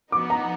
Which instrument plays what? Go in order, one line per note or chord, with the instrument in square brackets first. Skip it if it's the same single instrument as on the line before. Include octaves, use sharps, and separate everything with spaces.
[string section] F3 B3 D#4 F#4 [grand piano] D6
[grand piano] A#5